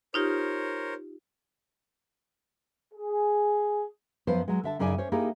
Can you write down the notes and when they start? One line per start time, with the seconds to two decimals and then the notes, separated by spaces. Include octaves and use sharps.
0.14 D#4 F4 G4 A#4 C5 C#5
2.93 G#4
4.27 F#2 F3 B3 B4 C5
4.48 F#3 G#3
4.64 D3 E5 A5
4.79 F#2 C#3 D#4 D5 G#5
4.98 C#4 C5 C#5
5.12 A#3 D#4 E4 G4 G#4